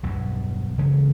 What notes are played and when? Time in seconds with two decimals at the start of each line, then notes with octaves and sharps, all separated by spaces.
0.03 B1 E2 G2
0.78 C#3 E3 G#3 C#4